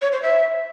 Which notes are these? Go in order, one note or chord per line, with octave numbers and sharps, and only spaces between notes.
C#5
C5
E5